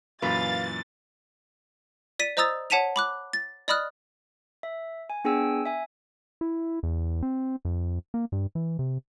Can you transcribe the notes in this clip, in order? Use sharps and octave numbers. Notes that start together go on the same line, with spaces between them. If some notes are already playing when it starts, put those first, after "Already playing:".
F#2 A#2 E3 B4 F5 A6
D5 B6 D#7
C5 D#5 A#5 D#6 E6 A6
C#5 F#5 A5 B6 D#7 F7
B5 D6 F#6
A6
D5 D#5 B5 D#6 F6 F#6
E5
G#5
B3 D4 G#4 G5 G#5 E6
E5 G#5
E4
E2
C4
F2
A#3
G2
E3
C3